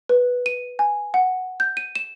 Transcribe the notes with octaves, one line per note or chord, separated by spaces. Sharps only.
B4
D#7
G#5
F#5
G6
D#7
E7